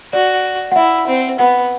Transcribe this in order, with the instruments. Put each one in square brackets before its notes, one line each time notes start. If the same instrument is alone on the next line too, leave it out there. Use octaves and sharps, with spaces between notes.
[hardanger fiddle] F#4 [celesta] D5
[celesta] F#5
[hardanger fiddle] E4 [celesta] E5
[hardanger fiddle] C4
[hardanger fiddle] B3 [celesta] F#5